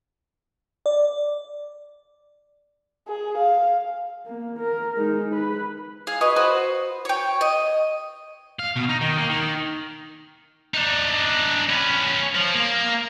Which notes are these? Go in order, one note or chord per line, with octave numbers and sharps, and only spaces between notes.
D5
G#4
F5
A#3
A#4
G#3 D#4
B4
G#4 F5
F#4 B4 D#5
F#4 B4 C5
C#5 G5
D#5
F5
B2
D#4
D#3
A#3
D#3
D4 D#4
C#4 B4
F3
A#3